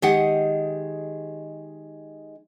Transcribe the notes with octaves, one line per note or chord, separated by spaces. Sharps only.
D#3 G#3 G4 G#4 D#5 F#5